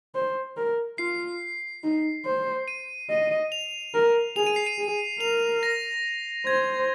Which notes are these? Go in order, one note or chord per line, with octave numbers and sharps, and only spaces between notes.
C5
A#4
F4 C7
D#4
C5
D#7
D#5
F7
A#4
G#4 F7
D#7
C7
D#7
G#4
A#4 F7
A#6
C5 G#6